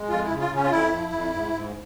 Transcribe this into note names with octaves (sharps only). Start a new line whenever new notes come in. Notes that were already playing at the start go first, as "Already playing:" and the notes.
Already playing: G#3
F2 F4
E4
C#3
F4
C#3
C#4
F4
F2 E4
F3
F2
G#2
G#2